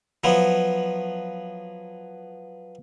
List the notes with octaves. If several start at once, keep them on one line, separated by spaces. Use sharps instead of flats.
F3 F#3 B3 E4